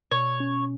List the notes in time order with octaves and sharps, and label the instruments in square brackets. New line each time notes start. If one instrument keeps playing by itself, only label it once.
[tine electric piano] B2 [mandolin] C#5
[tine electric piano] C#4